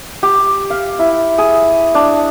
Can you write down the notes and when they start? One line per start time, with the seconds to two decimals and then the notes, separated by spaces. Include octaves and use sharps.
0.23 G4
0.70 F5
0.99 E4
1.38 G#4
1.95 D4